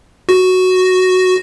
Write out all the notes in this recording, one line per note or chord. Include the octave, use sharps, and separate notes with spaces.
F#4